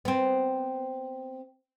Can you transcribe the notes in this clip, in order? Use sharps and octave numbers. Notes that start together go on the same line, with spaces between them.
B3 C4